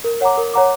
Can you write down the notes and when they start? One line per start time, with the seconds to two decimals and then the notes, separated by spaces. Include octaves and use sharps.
0.04 A#4
0.21 C#5 F#5 A#5 D6
0.37 A#4
0.54 C#5 F#5 A#5 D6